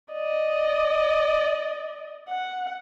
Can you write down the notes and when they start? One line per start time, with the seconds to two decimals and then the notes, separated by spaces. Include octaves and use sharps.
0.13 D5 D#5
2.29 F#5